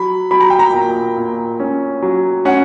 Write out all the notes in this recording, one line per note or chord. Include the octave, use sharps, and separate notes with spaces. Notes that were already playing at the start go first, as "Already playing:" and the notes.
Already playing: F#3 B5
F#3 B5
A#5
G5
A#5
A#2
A#2
C#4
F#3
C#4 F#5